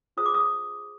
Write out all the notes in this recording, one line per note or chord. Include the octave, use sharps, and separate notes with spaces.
F4 G#4 C5 D#6
D6
D#6